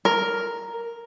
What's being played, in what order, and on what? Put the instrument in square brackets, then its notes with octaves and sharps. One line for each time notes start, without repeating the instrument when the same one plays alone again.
[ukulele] A#4